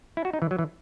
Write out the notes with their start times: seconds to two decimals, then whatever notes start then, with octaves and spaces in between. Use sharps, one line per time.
0.17 E4
0.25 F#4
0.33 D#4
0.42 E3
0.51 F#3
0.59 E3